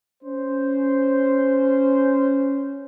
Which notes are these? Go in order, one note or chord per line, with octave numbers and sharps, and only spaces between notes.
C#4 C5